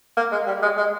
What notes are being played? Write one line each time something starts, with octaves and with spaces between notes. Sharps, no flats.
A#3
G#3
G3
G#3
G#3